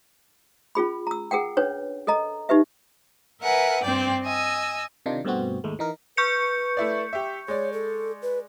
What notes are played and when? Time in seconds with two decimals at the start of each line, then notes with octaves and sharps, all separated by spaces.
0.75 C#4 F4 G#4 B5
1.07 A#5 E6
1.31 G#4 A#4 F#5 G5
1.57 C#4 D4 B4 C#5
2.07 A4 A#4 D#5 A#5
2.49 D#4 G4 B4 E5
3.41 A#4 B4 E5 F#5 G#5
3.84 G2 C4 D5 G5 G6
4.24 D#5 G#5 E6
5.06 C3 D#3 D4 D#4 F4
5.24 G2 B2 A3 B3 C4 F#4
5.64 D#2 G#2 G#3 A3
5.79 E3 D#4 A#4
6.17 B4 C#6 G6 C#7
6.77 A3 E4 D5
7.13 G4 E5
7.48 G#3 C#5 D5
7.73 A4
8.22 B4